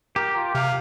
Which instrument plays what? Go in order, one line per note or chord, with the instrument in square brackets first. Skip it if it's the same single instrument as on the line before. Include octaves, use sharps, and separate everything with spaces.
[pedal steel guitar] G4 [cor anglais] A#4
[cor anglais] F4
[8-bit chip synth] C3 [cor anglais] F5